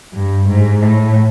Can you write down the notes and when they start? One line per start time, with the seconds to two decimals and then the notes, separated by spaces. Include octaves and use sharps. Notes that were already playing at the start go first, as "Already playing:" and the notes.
0.14 G2
0.48 G#2
0.81 A2